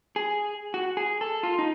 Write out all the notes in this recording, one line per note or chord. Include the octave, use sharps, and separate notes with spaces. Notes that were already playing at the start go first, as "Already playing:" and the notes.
G#4
F#4
G#4
A4
F4
D#4